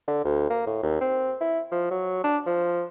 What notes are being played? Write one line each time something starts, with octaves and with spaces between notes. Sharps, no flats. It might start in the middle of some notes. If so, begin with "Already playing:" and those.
D3
D2
A#3
A2
D#2
C4
E4
F3
F#3
D4
F3